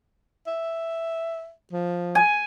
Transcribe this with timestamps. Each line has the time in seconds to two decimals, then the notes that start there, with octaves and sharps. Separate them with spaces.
0.47 E5
1.72 F3
2.15 G#5